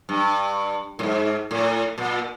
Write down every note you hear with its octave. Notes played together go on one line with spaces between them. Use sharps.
G2
A2
G#2
A2
A#2